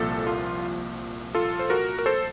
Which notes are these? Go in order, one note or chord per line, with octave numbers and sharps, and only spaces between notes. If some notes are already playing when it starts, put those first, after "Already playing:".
Already playing: C2 A#2 F3 A#3 A4
F4
F4 A4
C5
F#4 A#4
A#4
A4 C5